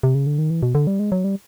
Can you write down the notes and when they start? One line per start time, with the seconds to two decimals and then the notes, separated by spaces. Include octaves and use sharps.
0.03 C3
0.15 C#3
0.27 D3
0.38 D#3
0.50 E3
0.63 B2
0.75 D3
0.87 G3
0.99 G#3
1.12 F#3
1.24 G3